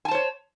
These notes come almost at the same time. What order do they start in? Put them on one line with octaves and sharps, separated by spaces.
G#5 A5 C5 C#5